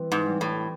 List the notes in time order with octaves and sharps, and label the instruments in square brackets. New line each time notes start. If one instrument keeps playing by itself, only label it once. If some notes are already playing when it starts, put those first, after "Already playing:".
Already playing: [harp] E3 G3 C4
[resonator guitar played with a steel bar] G#2
[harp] G3 C4
[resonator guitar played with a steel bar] A2